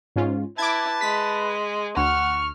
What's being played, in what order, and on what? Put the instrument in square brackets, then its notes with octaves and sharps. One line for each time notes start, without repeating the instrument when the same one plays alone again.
[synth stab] G#2 C#4 F4
[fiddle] E4 [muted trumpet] B4 [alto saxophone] A5 [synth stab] D6 G#6
[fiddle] G#3 [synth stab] B6
[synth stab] D2 [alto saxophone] F#5 [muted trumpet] C#6 [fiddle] F6